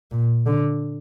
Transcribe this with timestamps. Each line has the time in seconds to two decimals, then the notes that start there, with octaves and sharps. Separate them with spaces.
0.12 A#2
0.47 D3